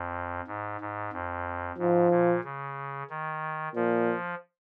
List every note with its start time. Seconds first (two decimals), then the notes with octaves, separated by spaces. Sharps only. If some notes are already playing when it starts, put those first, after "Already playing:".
Already playing: F2
0.47 G#2
0.81 G#2
1.13 F2
1.78 G#2 F3
2.11 A#2
2.44 C#3
3.10 D#3
3.75 A#2 F3